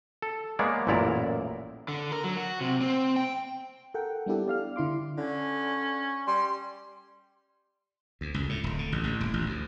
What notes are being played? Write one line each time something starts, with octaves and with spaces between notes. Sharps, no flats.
A4
G#3 A#3 B3 C#5 D5
A1 F#2 A#2 E4 D5 A#5
D3
A#4
F#3
F#4
C3
C4
G5
A4 A#4 F#5 G5
G3 B3 D4 E4 G4 A4
D5 F5 F6
D3 E4 C6 D6
D3 C#4
G3 C6
D2
C#2
A2
D1
D3
A1
A1
D#1
A1
D2